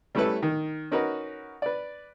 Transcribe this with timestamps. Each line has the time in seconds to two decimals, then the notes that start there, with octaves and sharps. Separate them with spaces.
0.15 G3 A3 C#4 E4 A4 B4
0.42 D#3
0.91 C#4 D#4 F#4 A#4 B4
1.62 B4 D5